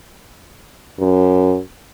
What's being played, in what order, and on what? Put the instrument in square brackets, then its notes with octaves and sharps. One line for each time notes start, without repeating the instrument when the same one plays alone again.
[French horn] F#2